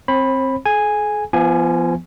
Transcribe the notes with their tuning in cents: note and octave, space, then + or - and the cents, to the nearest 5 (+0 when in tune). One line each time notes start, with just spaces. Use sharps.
C4 +15 C5 +40 B5 +0
G#4 +45 G#5 -5
F3 -30 B3 +0 G#5 +0